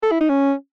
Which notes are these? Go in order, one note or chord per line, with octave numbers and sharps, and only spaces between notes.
A4
E4
D#4
C#4